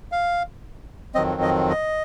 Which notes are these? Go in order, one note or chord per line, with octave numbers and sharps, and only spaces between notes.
F5
F2 D#3 F#3 C4 D#5
D#5
D#5